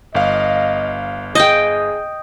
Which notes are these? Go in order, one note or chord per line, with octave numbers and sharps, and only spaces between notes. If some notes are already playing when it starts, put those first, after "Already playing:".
G1 D#5 F5
G#4 D#5 G5 D#6 G6